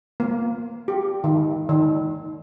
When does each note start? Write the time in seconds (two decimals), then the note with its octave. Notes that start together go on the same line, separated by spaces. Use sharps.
0.20 A#3
0.88 G4
1.24 D#3
1.69 D#3